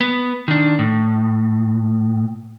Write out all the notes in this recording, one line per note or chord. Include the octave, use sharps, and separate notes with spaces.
B3
D#3 D4
A2